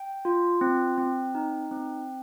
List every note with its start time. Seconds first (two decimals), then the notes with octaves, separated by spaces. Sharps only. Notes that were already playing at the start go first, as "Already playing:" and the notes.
Already playing: G5
0.25 F4
0.61 C4
0.98 C4
1.35 D#4
1.71 C4